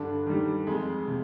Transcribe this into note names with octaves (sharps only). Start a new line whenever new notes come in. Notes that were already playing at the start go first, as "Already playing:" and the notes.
Already playing: G2 D3 D4
D#3 G3
F2 G#3
C3